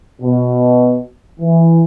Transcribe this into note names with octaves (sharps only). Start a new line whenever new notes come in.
B2
E3